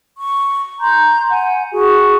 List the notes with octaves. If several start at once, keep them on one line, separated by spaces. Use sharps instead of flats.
C#6
A#5 C6 G6
F#5 G#5
F#4 G#4